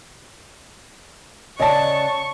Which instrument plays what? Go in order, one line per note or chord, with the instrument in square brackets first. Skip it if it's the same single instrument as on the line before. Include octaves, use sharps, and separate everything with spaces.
[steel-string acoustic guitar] C#3 [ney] D5 [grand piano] D#5 A5 [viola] C#6